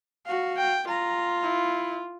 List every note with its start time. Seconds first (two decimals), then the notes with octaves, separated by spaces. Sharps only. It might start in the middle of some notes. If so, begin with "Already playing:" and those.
0.26 F#4 F5
0.57 G5
0.88 F4 A#5
1.43 E4